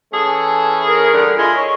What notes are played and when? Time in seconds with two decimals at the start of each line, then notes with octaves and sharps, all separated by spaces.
0.13 E3 C#4 G#4 A4
0.87 A#4
1.12 G2 D3
1.38 E4 F4 G#4 D#5
1.55 C#5